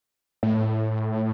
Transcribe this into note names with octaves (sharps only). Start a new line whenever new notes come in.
A2